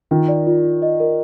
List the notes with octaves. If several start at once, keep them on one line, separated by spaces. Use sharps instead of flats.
D#3 F4
D5
F4
F4
D#5
A#4